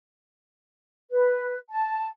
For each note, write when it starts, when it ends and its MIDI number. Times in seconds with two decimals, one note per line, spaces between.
1.11 1.57 71
1.70 2.07 81